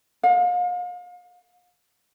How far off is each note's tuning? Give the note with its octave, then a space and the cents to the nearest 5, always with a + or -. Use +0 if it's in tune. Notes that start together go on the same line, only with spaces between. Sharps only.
F5 +35